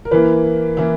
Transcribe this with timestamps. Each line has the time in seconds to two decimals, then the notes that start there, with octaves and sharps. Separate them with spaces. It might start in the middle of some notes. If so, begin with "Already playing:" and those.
0.05 A#4
0.11 E3 A#3 E4 B4
0.77 E3 A#3 E4